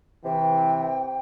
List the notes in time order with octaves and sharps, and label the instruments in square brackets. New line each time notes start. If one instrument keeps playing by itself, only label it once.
[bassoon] C3 [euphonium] E3 [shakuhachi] G5